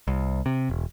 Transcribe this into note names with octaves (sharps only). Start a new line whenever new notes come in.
C2
C3
E1